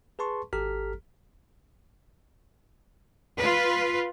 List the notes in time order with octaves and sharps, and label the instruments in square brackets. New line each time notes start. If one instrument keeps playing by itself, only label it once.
[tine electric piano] G#4 B4 A5 C6 C#6
G#1 G4 A4 A#5 F6 B6
[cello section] F4 B4